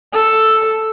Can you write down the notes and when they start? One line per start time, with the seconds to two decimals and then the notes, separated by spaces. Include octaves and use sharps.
0.14 A4